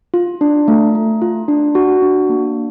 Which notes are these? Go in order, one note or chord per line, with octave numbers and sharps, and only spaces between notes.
F4
D4
A3
A3
F4
D4
F#4
D4
A#3